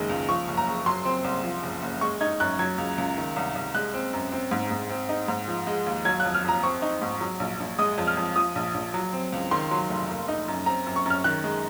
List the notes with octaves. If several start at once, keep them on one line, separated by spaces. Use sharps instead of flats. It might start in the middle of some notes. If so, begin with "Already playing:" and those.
Already playing: F#1 D#3 G#3
C#2
F3 C#6
F#1
A#5
F#1
F#3 C6
C4
C2
F3
F#1
F#1
G#3 C#6
D#4 G#6
F#2 F#6
F#3 G#6
C#2
C#2
D#3
C2
C2
G#3 F#6
C4
F#2
C4
G#2
G#2
C4
D#4
G#2
F3
G#3
D#2
F#3 G#6
F#6
F2
F6
F2 A#5
C4 C#6
D#4
G#2
F#3
A#1
A#1
G#3 D#6
F2
F6
F2
F3 D#6
A#1
A#1
F#3
C4
C#2
D#3 C6
F#3
F1
A#3
D#4
F#2
C4 A#5
F#2
C#6
F#2 F6
D#3 F#6
G#3